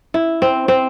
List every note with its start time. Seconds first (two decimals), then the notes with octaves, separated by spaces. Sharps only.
0.14 E4
0.42 C4
0.68 C4